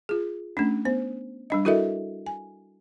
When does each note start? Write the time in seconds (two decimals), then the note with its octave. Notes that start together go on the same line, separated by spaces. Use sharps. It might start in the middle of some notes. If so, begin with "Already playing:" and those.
0.09 F4 G#4
0.57 A3 C#4 D4
0.85 B3 C5
1.50 G3 D4 D#5
1.65 E4 F#4 A4 A#4 D#5 E5
2.26 G#5